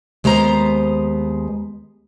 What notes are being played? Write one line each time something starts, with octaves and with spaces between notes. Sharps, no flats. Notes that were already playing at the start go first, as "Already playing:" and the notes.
D#2 G#3 B3 C5 A#5